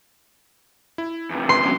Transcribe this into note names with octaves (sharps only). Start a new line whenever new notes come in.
E4
E2 C3
B4 C6
F#3 B3 C#4